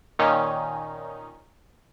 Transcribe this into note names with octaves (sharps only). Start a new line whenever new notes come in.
A#2 D#3 C#4 D#4